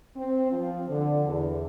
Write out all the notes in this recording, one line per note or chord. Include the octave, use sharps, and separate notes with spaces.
C4
F3
D3
E2